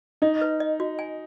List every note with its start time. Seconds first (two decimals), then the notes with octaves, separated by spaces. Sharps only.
0.22 D#4 D#5
0.42 B4
0.60 D#5
0.80 F#4
0.99 G#5